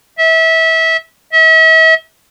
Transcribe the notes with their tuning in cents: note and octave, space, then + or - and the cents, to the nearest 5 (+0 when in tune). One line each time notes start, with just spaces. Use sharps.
E5 -25
E5 -40